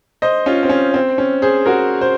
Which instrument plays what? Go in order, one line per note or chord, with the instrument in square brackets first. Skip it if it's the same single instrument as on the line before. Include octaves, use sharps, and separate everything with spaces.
[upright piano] C5 D#5
C#4 F4
C4
C#4
C4
C#4
G#4 C5
F#4 A#4
C5